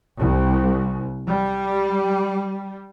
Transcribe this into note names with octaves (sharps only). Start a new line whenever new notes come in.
C2
G3